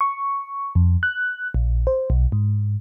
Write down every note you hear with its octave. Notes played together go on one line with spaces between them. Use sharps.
C#6
F2
F#6
A#1
C5
B1
G#2